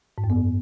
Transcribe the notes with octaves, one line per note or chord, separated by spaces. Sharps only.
G#2
F#2
B3